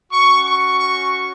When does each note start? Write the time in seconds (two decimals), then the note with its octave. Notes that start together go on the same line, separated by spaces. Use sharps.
0.12 C#4 F#4 C#6
0.46 C#6
0.80 C#6